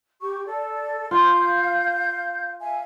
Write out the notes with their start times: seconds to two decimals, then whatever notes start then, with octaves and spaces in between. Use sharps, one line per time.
0.22 G4 C#6
0.45 A4 D5
1.11 F4 F5 G6
2.61 E5 F5 G#5